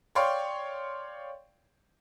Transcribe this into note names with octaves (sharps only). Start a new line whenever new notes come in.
C#5 D5 F5 G5 C6 C#6